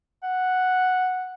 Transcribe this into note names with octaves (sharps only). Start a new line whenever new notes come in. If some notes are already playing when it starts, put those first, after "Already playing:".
F#5